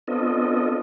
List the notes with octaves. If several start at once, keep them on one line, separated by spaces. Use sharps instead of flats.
B3 C4 D4 F4 A4 D#5